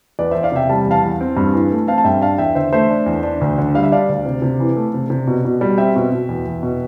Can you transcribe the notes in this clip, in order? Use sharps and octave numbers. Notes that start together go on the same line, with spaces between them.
E2 B4 D5
E2 C5 E5
D5 F5
C3 E5 G5
G3 A5
E2
F5 A5
E2
C4
G2
E3
A3
C4 F5 A5
A5
G2 E5 G5
D4 F5 A5
E2 E5 G5
D3 C5 E5
A3 C5 E5
D4
E2
D4
D2
D3
G3 F5
E5
D4 D5 F5
D2
C3
C3
E3
A3
C3
C3
B2
B2
G3
C4 E5 G5
B2
B2
E2
E2
B2